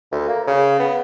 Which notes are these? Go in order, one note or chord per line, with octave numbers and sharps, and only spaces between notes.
D2
A#3
C#3
B3